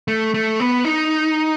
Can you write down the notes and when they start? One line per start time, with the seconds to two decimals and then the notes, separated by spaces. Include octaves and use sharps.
0.08 A3
0.34 A3
0.60 B3
0.85 D#4